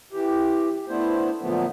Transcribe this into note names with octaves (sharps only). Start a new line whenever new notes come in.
E3 G4
A3 B3 D4 E4 C5
A#2 D3 F3 F#3 A3 B3